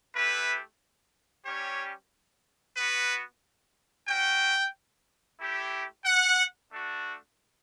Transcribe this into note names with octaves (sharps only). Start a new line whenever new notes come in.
A3 E4 G4 B4
G3 C#4 G4 C#5
B3 F#4 B4
C#4 F#4 G5
A3 E4 G4
F#5
A3 D4 F#4